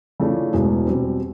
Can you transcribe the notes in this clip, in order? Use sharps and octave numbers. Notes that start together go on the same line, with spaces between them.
C#3 E3 A3 D4 F4
E1 E2 B2 G#3
B2 G3 C4